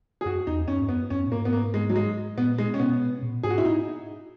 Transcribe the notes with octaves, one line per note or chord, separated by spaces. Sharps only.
G#4
F#2 F#4
E2 D#4
F#2 C#4
G#2
F#2 B3
F#2 C#4
A#2
G#2 A#3
B3
A#3
G#3
F#3
G#3
A#2 B3
G#3
C#4
B2 B3
A#2
G#2 G#4
F#4
E4
D#4